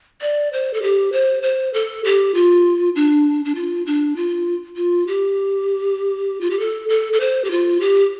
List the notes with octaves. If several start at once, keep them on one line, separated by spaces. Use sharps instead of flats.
D5
C5
A4
G4
C5
C5
A4
G4
F4
D4
D4
F4
D4
F4
F4
G4
F4
G4
A4
A4
A4
C5
G4
F4
G4